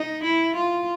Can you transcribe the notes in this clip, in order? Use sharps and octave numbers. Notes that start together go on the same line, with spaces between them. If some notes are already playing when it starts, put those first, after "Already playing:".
Already playing: D#4
E4
F4